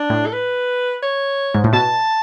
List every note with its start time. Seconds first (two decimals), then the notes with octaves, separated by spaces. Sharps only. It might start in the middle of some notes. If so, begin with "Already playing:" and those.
Already playing: D4
0.10 A2
0.26 A4
0.33 B4
1.03 C#5
1.54 G#2
1.64 A2
1.73 B2 A5